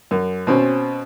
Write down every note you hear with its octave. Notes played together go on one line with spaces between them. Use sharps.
F#2
B2 C4 C#4